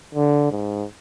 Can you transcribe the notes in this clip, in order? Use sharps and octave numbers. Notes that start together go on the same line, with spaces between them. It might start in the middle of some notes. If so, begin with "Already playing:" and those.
D3
G#2